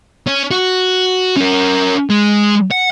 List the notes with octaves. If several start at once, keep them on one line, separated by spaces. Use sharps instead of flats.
C#4
F#4
C#4 A#4
G#3
F#5